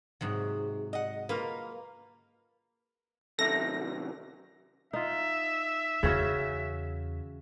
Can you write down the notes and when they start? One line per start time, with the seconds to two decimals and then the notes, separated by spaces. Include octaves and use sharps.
0.21 G#2 C3 F#3
0.93 D#5 F#5
1.29 A#3 F4 A#4 B4
3.39 F#2 C3 D#3 A4 E5 A#6
4.93 D#4 F4 E5
6.03 E2 C#3 C#4 F#4